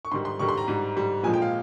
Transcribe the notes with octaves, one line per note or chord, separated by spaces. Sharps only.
C#6
G#2 D#3 G3 C6
C6
G#2 D#3 G3 C#6
C6
A#5
G#2 G3
G#2 G3
A#2 F3 G#3 G#5
G5
F5